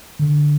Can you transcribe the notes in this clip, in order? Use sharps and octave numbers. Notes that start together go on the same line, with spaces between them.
D3